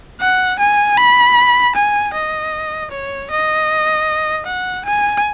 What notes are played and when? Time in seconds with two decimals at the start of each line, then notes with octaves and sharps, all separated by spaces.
0.20 F#5
0.59 G#5
0.97 B5
1.75 G#5
2.13 D#5
2.91 C#5
3.30 D#5
4.46 F#5
4.85 G#5